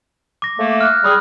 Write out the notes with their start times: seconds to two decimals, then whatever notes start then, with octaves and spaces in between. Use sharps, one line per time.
0.42 D6 A#6
0.59 A3 A#3
0.81 F6 F#6
1.04 G3 G#4 B5 D#6 F6